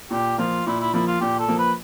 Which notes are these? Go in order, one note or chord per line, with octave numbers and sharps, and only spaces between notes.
A#2 G4
F3 A#3 F4
A#2 E4
E4
F3 A#3 E4
F4
A#2 G4
A4
F3 A#3
B4